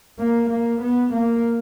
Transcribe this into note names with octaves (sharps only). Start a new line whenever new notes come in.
A#3
A#3
B3
A#3